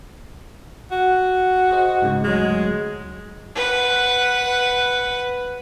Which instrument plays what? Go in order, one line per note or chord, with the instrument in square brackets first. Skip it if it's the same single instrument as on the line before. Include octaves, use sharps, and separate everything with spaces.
[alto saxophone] F#4
[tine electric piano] G#4 C5 D#5
G#2 C#3 G#3
[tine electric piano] D2 F#3 [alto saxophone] G#3
[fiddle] B4 F#5